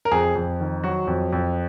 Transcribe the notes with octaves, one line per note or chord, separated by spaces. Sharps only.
A#4
F2 G#4
F2
D#3
F#3 F#4
F2
F2